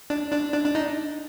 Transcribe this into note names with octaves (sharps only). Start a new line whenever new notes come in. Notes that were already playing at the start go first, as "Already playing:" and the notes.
D4
D4
D4
D4
D#4